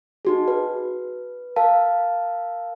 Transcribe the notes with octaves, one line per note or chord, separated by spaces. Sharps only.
D#4 F#4 G#4
B4
A#4 F5 A5